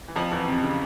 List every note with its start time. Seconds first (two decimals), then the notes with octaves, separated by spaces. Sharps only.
0.08 E3
0.16 F2 F3
0.32 E2 E3
0.48 C3
0.64 C#3